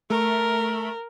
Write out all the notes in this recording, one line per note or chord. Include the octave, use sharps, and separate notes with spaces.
A3 A#4